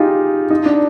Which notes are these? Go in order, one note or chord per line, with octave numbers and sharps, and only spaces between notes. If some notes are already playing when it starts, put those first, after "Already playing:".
Already playing: D#4 F4 G4 G#4
D#4
D4